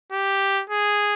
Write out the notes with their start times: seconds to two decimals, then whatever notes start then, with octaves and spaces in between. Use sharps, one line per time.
0.12 G4
0.70 G#4